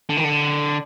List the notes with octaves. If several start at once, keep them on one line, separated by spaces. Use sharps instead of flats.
D3
D#3
D3